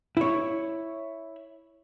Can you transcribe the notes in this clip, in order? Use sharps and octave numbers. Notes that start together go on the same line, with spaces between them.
E4 C#5